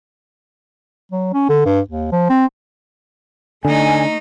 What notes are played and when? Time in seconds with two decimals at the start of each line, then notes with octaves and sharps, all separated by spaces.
1.12 F#3
1.34 C#4
1.49 D3
1.65 G2
1.88 D#2
2.12 F3
2.30 C4
3.65 D3 A3 D#4 G#5